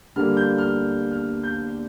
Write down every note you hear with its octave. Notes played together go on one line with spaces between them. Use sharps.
D3 G3 A#3 F6
G6
F6
F6
G6